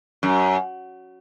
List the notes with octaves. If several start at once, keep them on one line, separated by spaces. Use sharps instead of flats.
F#2